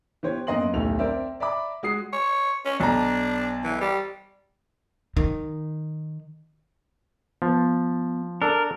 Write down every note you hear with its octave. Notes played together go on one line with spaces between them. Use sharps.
E3 B3 G4 C5 C#5
F#2 A#3 B3 D#5 C6 F#7
D#1 B1 A2 A3 F7
C4 A#4 C5 D5 E5
D5 E5 A#5 B5 D6
G#3 F#4 D#6 C7
C#5
C#4
B1 D4 A#5
E3
G3
D#3
F3 B3
D4 A4 A#4